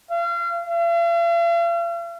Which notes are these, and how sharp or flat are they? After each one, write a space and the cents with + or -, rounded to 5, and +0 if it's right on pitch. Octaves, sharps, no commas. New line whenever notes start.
F5 -30
F5 -45